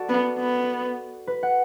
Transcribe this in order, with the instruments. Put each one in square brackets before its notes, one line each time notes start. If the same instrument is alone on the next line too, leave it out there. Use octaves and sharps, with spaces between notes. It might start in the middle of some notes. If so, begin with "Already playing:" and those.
Already playing: [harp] F#4 A4 D5
[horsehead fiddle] B3
B3
[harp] B4
F#5